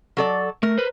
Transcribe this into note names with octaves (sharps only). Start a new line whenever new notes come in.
F#3 A4 D5
A3 A#4
B4 C5